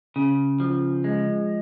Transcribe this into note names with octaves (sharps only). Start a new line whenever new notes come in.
C#3
F3
G#3